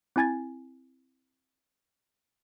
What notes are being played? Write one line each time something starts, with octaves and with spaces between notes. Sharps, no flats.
C4 E4 G#5 G#6 A6